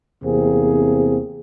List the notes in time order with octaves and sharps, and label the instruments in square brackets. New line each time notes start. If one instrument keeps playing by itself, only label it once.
[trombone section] E2 C3 A#3 C4 G#4